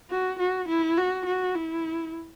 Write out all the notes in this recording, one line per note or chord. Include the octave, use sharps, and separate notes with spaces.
F#4
F#4
E4
F#4
F#4
E4